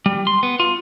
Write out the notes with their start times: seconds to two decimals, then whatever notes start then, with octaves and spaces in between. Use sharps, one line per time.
0.06 G3
0.27 C6
0.43 B3
0.60 F4